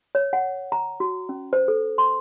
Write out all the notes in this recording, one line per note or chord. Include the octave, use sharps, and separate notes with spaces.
C#5
F#5
A#5
F#4
C#4
C5
A4
C6